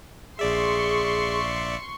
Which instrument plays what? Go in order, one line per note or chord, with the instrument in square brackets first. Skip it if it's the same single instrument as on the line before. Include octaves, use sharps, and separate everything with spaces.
[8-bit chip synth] A#1 D5 E5 [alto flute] G#4 [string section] C6 C#6